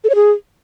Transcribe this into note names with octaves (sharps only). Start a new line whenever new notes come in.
A4
C#5
G#4